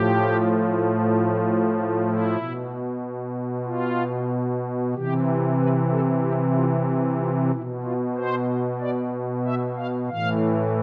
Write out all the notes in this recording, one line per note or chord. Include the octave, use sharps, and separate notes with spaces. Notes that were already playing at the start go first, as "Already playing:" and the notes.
Already playing: A2 F3 G4
F4
E4
B2
F4
C3 E3 G4
B4
A4
G4
F4
E4
F4
B2 E4
F4
C5
D5
E5
F5
A2 E3 F5